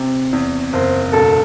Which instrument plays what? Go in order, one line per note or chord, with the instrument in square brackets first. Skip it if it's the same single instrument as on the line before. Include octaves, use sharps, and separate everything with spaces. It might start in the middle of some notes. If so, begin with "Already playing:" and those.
Already playing: [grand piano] C3
E2
[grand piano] F#1 [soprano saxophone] C5
[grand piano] E1 [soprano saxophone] A4